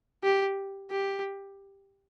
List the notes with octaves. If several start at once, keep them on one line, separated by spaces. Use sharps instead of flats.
G4
G4